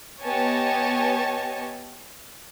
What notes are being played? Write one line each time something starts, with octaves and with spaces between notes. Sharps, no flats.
B3 G4 C#5 D#5 G#5 A5